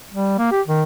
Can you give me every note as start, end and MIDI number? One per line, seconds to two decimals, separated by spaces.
0.13 0.34 55
0.38 0.51 58
0.51 0.60 67
0.67 0.83 51